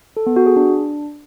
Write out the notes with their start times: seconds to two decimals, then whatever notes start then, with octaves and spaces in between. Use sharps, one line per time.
0.17 A4
0.26 B3
0.36 F#4
0.46 G#4
0.56 D4